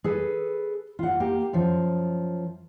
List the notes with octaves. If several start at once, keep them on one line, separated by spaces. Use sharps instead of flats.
G#4 A4 B4
F4 F#5
A#3 G4
F#2 F3